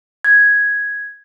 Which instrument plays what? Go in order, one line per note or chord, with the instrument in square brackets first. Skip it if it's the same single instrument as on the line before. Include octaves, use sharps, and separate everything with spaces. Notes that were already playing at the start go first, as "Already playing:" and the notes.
[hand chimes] G#6